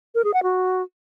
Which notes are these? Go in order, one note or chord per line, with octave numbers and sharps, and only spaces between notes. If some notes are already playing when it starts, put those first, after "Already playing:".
A#4
G#4
F#5
F#4